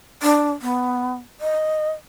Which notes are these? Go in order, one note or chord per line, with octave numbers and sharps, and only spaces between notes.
D4
B3
D#5